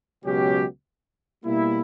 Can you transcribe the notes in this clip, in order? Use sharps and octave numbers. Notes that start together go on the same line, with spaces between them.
C#2 B2 F#3 C#4 G4
B2 G3 A#3 E4